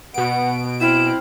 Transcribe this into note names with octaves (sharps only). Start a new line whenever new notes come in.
B2 B3 F#5 D7
C4 E4 F6 E7